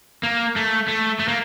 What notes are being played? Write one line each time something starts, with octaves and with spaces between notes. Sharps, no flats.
A#3
A3
A3
A3
A#3